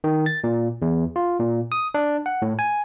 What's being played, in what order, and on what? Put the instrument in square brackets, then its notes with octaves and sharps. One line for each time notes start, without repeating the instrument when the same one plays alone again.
[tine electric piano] D#3
A6
A#2
E2
F4
A#2
D#6
D4
F#5
A2
G#5